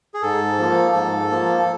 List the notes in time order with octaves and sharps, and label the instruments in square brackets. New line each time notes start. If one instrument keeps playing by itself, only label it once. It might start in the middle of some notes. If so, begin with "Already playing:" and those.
[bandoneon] G#4
G#2 A4
F3 A#3
G#2
F3 A#3